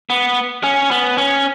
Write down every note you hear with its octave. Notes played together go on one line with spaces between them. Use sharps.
B3
C#4
B3
C#4